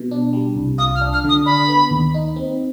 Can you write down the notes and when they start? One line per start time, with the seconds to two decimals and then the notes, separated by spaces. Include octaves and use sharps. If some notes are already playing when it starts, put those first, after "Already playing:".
Already playing: B2
0.11 D4
0.33 G3
0.56 C2
0.78 F4 D#6
0.95 F6
1.01 D4
1.13 F6
1.24 D3 D#6
1.46 D4 B5
1.68 B3
1.91 D#2
2.14 D#4
2.36 C4